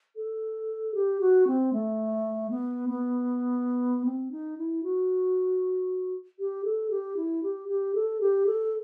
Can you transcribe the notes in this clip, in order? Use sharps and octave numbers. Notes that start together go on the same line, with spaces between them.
A4
G4
F#4
C4
A3
B3
B3
C4
D#4
E4
F#4
G4
A4
G4
E4
G4
G4
A4
G4
A4